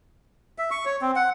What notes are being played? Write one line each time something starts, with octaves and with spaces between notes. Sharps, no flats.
E5
C#6
C#5
C4
F#5